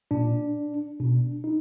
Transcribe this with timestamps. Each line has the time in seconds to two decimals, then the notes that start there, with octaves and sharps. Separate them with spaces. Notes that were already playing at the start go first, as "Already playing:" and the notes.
0.11 A#2 D4
1.00 B2 D4
1.44 D#4